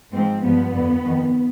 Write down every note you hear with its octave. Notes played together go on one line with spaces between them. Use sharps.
G#2 F3 C4
G2 F3 B3
F2 D3 F3
F2 D#3